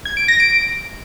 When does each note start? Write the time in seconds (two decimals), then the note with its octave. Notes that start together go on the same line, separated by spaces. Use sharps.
0.05 G#6
0.17 D7
0.28 A#6
0.40 D7